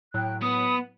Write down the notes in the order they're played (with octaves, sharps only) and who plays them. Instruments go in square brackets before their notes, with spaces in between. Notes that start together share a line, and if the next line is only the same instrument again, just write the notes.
[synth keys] A2 F#3 [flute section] G5 F#6
[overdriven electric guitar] B3 [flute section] B5 [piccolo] D#6